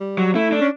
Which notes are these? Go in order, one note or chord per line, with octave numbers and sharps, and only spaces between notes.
G3
F#3
A3 E4
D4
C#4